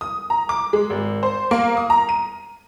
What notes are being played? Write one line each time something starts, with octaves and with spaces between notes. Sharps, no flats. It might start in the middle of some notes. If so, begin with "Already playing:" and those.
D#6
A#5
D6
G#3
G#1
C5
A#3
D#6
A#5
D#7